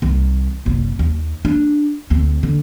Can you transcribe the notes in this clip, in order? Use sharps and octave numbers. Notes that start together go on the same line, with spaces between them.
C2 D#3
F#1 C2
D#2
D4
D2 C4
D3